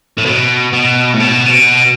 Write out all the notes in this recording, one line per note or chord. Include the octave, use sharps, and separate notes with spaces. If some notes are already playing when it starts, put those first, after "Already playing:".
A2
B2
B2
A2
B2
C3
B2